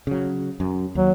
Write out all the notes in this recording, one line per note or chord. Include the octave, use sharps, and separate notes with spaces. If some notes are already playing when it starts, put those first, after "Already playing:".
C#3 F#3
F#2
D#2 F#3